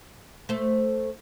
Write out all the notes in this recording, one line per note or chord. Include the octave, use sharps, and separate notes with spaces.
A3 C5